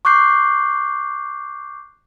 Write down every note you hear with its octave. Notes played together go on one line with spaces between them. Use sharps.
C#6 D6 F#6 G6 C7